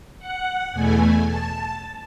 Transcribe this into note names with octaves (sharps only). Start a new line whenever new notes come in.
F#5
E2 B2 A3 G#5
A5